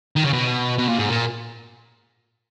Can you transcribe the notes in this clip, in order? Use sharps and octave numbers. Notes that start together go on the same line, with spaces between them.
D#3
C#3
B2
B2
A#2
G#2
A#2